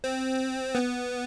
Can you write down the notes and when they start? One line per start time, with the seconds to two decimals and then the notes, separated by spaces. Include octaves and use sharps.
0.04 C4
0.75 B3